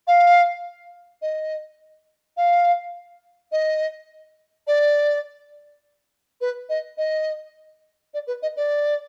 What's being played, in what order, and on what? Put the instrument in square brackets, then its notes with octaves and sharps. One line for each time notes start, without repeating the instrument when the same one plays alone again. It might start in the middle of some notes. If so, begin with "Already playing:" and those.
[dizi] F5
D#5
F5
D#5
D5
B4
D#5
D#5
D5
B4
D#5
D5